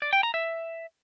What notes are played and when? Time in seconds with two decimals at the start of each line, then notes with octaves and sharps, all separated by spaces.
0.02 D5
0.13 G5
0.23 A#5
0.34 E5